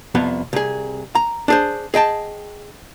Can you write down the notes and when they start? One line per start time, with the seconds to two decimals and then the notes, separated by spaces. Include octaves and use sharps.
0.15 C2 F2 B3
0.53 C2 G#4
1.15 A#5
1.48 D4 G#4 C5
1.94 G#4 D#5 G5 A5